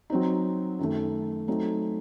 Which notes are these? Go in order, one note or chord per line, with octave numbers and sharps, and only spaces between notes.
F#3 C4 D#4
F#2 D#3 A3
F#3 A3 C4 D#4